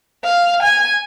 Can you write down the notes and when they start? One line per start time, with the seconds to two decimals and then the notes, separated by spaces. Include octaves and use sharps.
0.24 F5
0.62 G#5